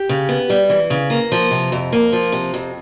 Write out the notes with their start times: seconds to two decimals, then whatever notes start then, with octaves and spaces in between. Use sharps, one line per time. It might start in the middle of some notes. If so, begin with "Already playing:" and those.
Already playing: G4
0.09 C#3
0.29 B3
0.50 G3
0.69 E3
0.90 C#3
1.10 A#3
1.32 F3
1.51 C3
1.72 F2
1.92 A#3
2.13 F3
2.32 C3
2.54 F2